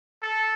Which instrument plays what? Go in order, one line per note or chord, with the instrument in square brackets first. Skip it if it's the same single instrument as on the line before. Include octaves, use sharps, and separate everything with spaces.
[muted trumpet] A4